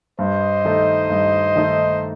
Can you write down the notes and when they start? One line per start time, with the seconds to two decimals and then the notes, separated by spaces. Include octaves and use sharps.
0.19 G2 C5 D#5
0.65 D#3 A3 D#4 A4
1.10 G2
1.56 D#3 A3 D#4 A4